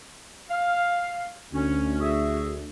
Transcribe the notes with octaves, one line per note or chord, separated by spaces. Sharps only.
F5
D2 C#4
F#4 G#4 E5